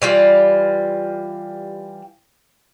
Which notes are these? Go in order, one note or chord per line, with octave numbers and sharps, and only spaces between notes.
E3 G3 F4